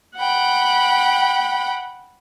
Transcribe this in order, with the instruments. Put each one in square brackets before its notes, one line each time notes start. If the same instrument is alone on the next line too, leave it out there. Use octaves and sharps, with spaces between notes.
[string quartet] F#5 G5 B5